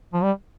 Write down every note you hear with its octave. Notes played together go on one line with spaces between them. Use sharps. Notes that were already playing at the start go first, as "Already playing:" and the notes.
F3
G3